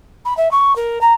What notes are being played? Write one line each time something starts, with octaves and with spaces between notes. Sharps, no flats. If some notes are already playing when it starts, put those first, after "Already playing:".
B5
E5
C#6
A#4
A#5